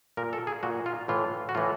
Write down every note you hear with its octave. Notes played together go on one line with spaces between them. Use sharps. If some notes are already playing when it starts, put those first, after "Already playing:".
A#2 A#4
A4
G#4
A#2 F#4
F4
A2 E3 F4
F#4
A2 E3 F4